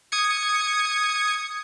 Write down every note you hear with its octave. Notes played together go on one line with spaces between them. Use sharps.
D#6 G#6 C#7